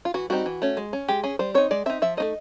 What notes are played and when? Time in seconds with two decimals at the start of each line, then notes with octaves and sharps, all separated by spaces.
0.05 F4
0.14 E3 F#4
0.30 G3 C4 D#4 F#4
0.46 E3
0.62 A3 C#4
0.77 G#3
0.93 C#4
1.08 G#3 G4
1.24 C#4 G#4
1.39 G3 C5
1.54 C4 D#4 C#5
1.71 G#3 D5
1.86 C4 D#4 E5
2.02 F3 E5
2.17 A3 C4 D#4 D#5